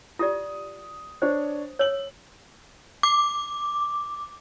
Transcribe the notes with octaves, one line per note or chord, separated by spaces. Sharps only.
F4 G4 D5 D#6
D4 C5 C#5
C#5 E6 F#7
D6